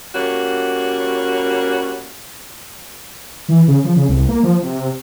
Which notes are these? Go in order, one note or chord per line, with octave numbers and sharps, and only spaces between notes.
G3 A#3 C#4 F#4
E3
C#3
F3
C#3
C2
A#3
F3
C3